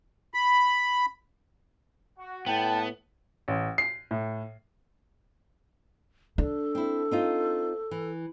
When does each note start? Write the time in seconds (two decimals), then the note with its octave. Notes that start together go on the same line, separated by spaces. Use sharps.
0.34 B5
2.18 F#4 F#5
2.46 A2 B3 G5 A5
3.48 A1
3.78 C7
4.11 A2
6.38 D4 A4
6.75 C4 E4
7.11 C4 D#4 F4
7.91 E3